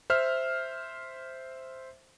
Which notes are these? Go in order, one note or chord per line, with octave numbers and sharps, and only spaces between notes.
C5 E5 F6